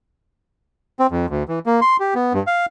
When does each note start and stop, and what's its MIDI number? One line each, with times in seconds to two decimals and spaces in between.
0.99 1.07 60
1.11 1.26 41
1.29 1.43 38
1.48 1.59 52
1.66 1.80 58
1.81 1.97 84
2.00 2.14 67
2.15 2.33 59
2.33 2.43 43
2.47 2.66 77